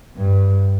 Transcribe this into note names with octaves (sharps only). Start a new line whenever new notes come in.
G2